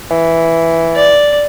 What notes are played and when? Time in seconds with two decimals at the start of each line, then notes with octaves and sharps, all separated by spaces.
0.11 E3
0.95 D5